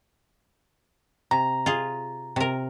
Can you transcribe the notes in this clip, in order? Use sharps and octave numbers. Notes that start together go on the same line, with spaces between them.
C3 A#5
F4 G#4
C3 A#4